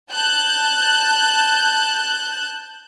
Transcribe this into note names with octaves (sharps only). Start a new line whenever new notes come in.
A5 F#6 G6